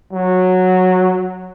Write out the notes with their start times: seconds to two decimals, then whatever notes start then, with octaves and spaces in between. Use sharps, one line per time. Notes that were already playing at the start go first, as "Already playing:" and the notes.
0.13 F#3